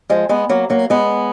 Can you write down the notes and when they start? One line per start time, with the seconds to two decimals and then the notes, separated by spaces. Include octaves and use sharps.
0.10 F3 G#3
0.29 G#3 B3
0.49 F#3 A#3
0.70 F#3 A#3
0.90 G#3 B3